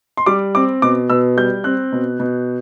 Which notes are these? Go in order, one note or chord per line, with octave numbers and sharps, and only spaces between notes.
C6
G3 D6
C4 D6
B2 D6
B2 E6
G3 G6
C4 F#6
B2
B2